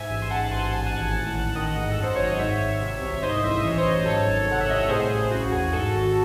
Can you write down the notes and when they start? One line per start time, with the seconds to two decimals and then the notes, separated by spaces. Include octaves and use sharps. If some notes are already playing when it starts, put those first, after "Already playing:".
Already playing: G#2 E5 G#5
0.10 A1
0.22 C6
0.30 G#2 F#5 A5
0.51 A1 G#5 C6
0.72 G#2 A5
0.79 G#5
0.86 F#5 A5
0.93 G#1
1.14 A2
1.34 A1
1.55 D#3 D#5 F#5
1.76 G#2
1.91 A4
1.97 F#2
2.03 C5
2.16 G#1 C#5
2.27 D#5
2.39 G#2 C#5 E5
2.60 G#1
2.81 C3
3.01 C2
3.13 E5
3.22 G#2 C5 D#5
3.43 A1 E5
3.55 D#5
3.64 E3 C#5
3.78 C5 D#5
3.85 F#2
4.06 G#2 A4 C#5
4.27 G#1
4.47 C3 F#5
4.61 E5
4.68 C2 D#5
4.80 C#5
4.89 A2 G#4 C5
5.10 A1 G#4
5.31 C#3 F#4
5.52 E2 G#4
5.73 G#2 F#4 A4
5.93 G#1